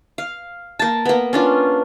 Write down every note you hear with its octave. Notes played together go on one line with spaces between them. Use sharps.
F5
A#3 A5
A#3 B3
C#4 D4 F4